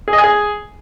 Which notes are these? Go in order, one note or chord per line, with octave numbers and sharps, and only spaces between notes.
G#4
D#5
G#5
G#4